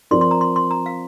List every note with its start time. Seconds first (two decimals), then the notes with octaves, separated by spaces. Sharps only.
0.11 F3 C4 A#4 D5 C6
0.21 C6
0.31 A#5
0.41 C6
0.56 C6
0.71 A#5
0.86 F5